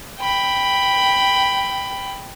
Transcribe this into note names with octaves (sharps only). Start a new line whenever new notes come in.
G5 B5